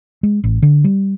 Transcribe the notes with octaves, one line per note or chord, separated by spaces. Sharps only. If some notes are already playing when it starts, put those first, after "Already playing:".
G#3
A1
D3
G3